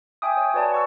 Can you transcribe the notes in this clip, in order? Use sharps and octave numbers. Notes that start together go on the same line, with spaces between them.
E5 G5 G#5 D6 D#6
C#5
F#4 B4 C#5 D5 G#5 A5
F#5 C#6 E6